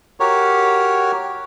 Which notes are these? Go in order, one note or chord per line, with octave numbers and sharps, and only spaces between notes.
F#4 G4 A#4 C#5